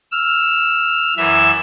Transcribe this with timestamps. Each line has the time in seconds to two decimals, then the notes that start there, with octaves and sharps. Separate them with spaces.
0.12 E6 F6
1.17 F#2 E3 E5 E6